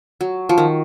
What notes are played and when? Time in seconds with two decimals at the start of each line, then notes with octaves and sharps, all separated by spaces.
0.21 F#3
0.49 F3
0.58 D#3